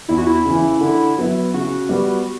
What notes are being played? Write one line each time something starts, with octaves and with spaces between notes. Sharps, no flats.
E2 E4
F#4
E4
C#3 E3
D3
F#3 B3 E4
C#3 F#4
G3 B3